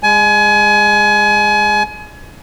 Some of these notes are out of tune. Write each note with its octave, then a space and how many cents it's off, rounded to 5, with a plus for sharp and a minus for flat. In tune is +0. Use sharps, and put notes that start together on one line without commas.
G#3 -30 G#5 +30